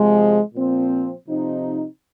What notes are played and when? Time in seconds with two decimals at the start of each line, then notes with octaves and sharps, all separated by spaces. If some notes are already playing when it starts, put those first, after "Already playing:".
Already playing: C3 F3 G#3
0.55 A#2 F3 C4
1.29 C3 F3 C4 D#4